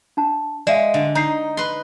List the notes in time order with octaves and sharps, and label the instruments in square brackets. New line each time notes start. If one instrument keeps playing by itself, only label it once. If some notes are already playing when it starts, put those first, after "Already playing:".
[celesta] D4 A5
[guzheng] G#3 [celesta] D5 E5 F5
[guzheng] D3
[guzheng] D#4 [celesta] A#5 G6 C7
[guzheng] B4 C6